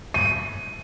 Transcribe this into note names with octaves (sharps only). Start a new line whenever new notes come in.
D#7